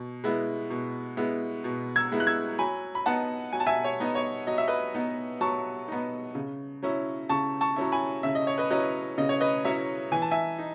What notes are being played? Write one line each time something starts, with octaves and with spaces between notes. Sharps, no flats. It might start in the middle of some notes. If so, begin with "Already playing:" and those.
Already playing: B2
G#3 B3 E4
B2
G#3 B3 E4
B2
E6 G#6
G#3 B3 E4
F#6
E6 G#6
F#3 G#5 B5
B5
B3 D#4 F#5 A5
F#3 G#5
A5
E5 G#5
C#5
B3 D#4
C#5
F#3 D#5
E5
B4 D#5
B3 D#4
F#3 A5 C#6
B3 D#4
C#3
F#3 C#4 E4
C#3 A5 C#6
A5 C#6
F#3 C#4 E4
G#5 B5
C#3 E5
D#5
C#5
B4 D#5
F#3 C#4 E4 B4 D#5
C#3 D#5
C#5
B4 D#5
F#3 C#4 E4 C#5 E5
E3 G#5
A5
E5 G#5
D#4